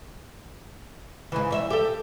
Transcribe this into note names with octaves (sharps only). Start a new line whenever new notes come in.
G#2 C#3 E3
G2 C#5 E5
G4 A4